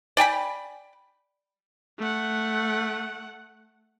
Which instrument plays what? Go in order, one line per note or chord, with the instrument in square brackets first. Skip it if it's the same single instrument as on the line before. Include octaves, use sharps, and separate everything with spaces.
[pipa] D5 G5 G#5 B5
[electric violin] A3 F#5